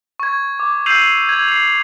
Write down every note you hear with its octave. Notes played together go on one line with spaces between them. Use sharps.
C#6 G#6
D6
E6 G6 C7 D#7 F7 F#7
G#6 F7
C7 F7